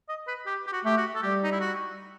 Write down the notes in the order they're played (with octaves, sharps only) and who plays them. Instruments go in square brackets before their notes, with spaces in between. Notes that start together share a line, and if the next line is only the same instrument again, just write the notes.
[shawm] D#5
B4
G4
G4
F#4
[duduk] A3 [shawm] G4
[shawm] F#4
A4
[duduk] G3 [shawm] G4
[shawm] D#4
E4
F#4